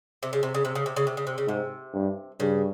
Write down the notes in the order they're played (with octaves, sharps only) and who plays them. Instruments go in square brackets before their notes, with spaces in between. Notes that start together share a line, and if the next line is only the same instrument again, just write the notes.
[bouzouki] C3
C#3
C3
C#3
C3
C#3
C3
C#3
C3
C#3
C3
C#3
[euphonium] G#2 [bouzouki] C3
[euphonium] G2
[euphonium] G2 [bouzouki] C#3